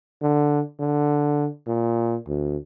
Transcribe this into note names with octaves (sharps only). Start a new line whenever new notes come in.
D3
D3
A#2
D2